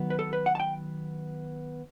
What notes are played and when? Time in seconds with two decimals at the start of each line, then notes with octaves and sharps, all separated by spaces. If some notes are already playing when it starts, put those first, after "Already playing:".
Already playing: D#3 F#3 B3
0.10 B4
0.19 A4
0.33 B4
0.46 F#5
0.55 A5
0.60 G5